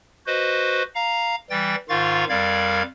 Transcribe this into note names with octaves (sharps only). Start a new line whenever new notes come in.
F#4 B4 C5 D#5
F5 A#5
E3 G3 G5 A6
G#2 D#3 F4 F5 C#6 A6
F2 G3 A#4 D5 F5 G#6